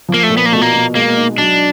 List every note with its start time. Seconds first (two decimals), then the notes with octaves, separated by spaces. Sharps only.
0.09 F3
0.14 A#3
0.23 A3
0.30 A#2
0.37 B3
0.46 A#3
0.52 B2 A3
0.61 A#3
0.73 B2
0.95 G#3 A#3
1.17 D#4
1.38 F#3 D4